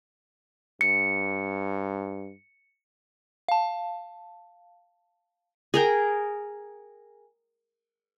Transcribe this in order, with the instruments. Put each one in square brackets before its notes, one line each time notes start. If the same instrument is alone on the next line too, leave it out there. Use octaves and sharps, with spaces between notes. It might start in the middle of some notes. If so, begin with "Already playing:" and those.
[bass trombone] G2 [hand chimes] C#7
[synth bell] F5 A5
[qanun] G#4 A#4 G5